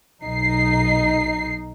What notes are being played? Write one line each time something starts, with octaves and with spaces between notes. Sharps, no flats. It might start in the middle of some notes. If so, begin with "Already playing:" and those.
B1 D#4 C7